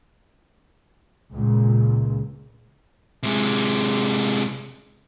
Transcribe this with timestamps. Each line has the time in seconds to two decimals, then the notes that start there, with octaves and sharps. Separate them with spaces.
1.33 C#2 A#2
3.23 C3 G#3